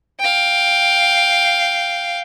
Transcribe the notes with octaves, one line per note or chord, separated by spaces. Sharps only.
F5 G5